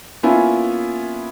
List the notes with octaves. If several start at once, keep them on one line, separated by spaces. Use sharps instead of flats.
A#3 B3 C#4 E4 F4 G#5